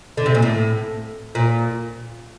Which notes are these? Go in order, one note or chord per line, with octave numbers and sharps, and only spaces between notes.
D3
C3
A#2
A2
A#2